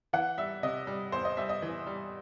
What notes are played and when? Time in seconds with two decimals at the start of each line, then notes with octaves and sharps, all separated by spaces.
0.13 E3 F#5
0.37 G3 E5
0.63 C3 D#5
0.87 G3
1.12 E2 C5
1.25 D#5
1.37 G3 E5
1.49 D#5
1.62 E3
1.87 G3